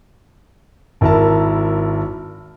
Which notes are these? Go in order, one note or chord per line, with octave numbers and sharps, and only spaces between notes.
G#1 E4 A#4 A5